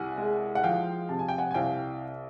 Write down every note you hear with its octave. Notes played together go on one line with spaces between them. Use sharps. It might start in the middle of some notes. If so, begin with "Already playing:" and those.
Already playing: C2 C3 F#5 G#5
G#3
F#5
F3 F5 G5
C3 A5
G#5
G5
F#5 G#5
G#5
C2 F5 G5